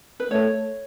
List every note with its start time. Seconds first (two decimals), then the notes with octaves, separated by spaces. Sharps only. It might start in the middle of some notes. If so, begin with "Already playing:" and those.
0.20 B4
0.31 A3 C#5